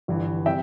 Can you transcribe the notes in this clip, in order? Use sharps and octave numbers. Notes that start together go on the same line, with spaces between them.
G1 G2 E3
C3 G3 E5 G5